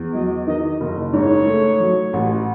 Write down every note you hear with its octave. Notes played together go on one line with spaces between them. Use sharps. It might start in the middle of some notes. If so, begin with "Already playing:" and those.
Already playing: E2
F#3 D#5
D#3 D#5
F#1
G#2 C#5
A3
F#3
A1